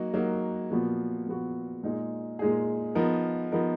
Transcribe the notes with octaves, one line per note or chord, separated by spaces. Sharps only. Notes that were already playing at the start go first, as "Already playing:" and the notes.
Already playing: F#3 A#3 D#4 F#4
F#3 A#3 D#4 F#4
A#2 F3 B3 F#4
A#2 F3 B3 F#4
A#2 G#3 D#4 G#4
A#2 G#3 D#4 G#4
F3 B3 D#4 A#4
F3 B3 D#4 A#4